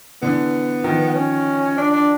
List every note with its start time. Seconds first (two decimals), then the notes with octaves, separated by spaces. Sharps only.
0.22 D3 E3 B3
0.84 D#3 F3
1.15 C#4
1.78 D4
1.93 D4